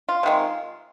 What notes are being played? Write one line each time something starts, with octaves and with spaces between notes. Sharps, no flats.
F4
C3 D#3 G#3